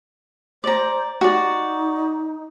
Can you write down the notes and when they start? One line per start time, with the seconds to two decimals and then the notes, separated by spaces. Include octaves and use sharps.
0.64 C5 D5 A#5
1.21 D#4 F#4 D5